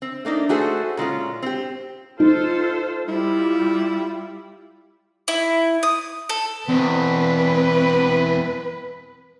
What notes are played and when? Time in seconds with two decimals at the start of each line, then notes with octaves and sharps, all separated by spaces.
0.02 C4
0.25 A3 A#3 D4 D#4
0.49 A3 F#4 G#4 A4 C5
0.97 A#2 G#3 C#4 F4
1.42 C4 G4
2.20 D#4 F4 A4 C5
3.08 G3 E4 F4
5.28 E4
5.83 D#6
6.29 A4
6.69 E2 B2 C4 B4